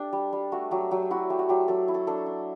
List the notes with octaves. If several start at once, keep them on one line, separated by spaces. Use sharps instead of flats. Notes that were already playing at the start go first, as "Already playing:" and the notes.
Already playing: D4 G4 A4 E5
G3
G3
A3 F#4
F#3 G4
F#3 G4
E4 F#4
A3 G4
F#4
F#3 G4
F#3 A4
E4
A4
D4 A4
D4